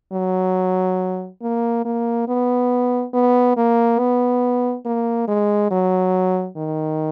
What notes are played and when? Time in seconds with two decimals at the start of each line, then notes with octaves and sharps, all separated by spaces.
0.13 F#3
1.42 A#3
1.85 A#3
2.28 B3
3.14 B3
3.57 A#3
3.99 B3
4.85 A#3
5.28 G#3
5.71 F#3
6.57 D#3